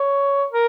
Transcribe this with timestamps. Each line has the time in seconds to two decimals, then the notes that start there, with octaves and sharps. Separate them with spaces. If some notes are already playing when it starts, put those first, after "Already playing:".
Already playing: C#5
0.52 A#4